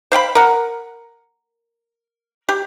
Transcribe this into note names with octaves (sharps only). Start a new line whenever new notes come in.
C5 F5 G5 B5
A#4 F#5
G4